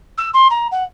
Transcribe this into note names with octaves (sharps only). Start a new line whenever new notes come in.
E6
C6
A#5
F#5